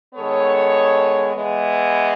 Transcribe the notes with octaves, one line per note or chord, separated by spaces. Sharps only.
D#3 G#3 B3 A4 C#5
E3 G#3 B3